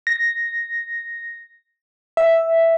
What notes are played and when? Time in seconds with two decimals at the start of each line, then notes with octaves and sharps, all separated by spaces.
0.07 A#6
2.17 E5